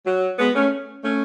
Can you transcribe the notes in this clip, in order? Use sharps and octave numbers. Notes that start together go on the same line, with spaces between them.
F#3
G#3 B3
A3 C#4
A3 C#4